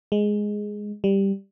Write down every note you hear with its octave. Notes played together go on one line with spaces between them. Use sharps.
G#3
G3